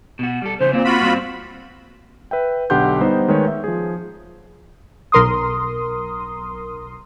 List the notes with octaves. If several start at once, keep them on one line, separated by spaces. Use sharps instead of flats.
B2 F#4
G3 A4
C#3 E3 F3 C5
A#2 A#3 C4
F4 F#4 B5
G2 C4
B4 E5 G5
B1 D3 G4 F#5 C6 G6
G3 B3 D#4 C5
D#3 G#3 A3 B4 C#5
E5
F3 G#4
B1 A#4 C6 D#6